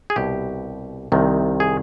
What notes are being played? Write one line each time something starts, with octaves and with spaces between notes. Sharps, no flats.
G#4
C2 B2 G4
C2 C3 D#3
G#4